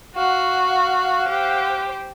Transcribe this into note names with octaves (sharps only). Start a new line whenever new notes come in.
F#4 F5 F#5
G4 C5